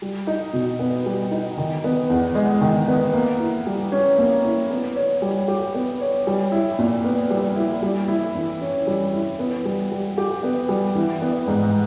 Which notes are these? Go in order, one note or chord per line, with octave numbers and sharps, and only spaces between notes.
G3
D#4
B2
B3
G3
D#4
D#3
B3
E2
G#3
D#3
B3
A#3
E4
G3
C#4
A#3
E4
B3
C#5
G3
G4
B3
C#5
G3
E4
A#2
B3
G3
E4
G3
E4
E3
C#4
G3
E4
B3
G3
G3
G4
B3
G3
E3
B3
G#2